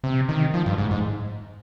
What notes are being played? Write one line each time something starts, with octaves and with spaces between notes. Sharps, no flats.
C3
D#3
F3
G2
G#2
G#2